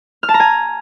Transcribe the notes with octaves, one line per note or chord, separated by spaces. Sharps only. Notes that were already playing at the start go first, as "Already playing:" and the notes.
F6
A5
A#5
G#5